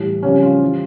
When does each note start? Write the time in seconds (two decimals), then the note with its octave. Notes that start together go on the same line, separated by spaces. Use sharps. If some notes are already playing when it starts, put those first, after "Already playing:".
Already playing: A2 E3 G3
0.23 F2 C#3 G3 C#4
0.43 F4
0.63 E3 G3